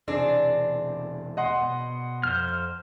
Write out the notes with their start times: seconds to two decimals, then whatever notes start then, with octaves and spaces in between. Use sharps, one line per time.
0.08 B1 E2 C3 C4 D4 G#4
1.37 D#5 F#5 C6
1.62 B2
2.23 F2 C5 F6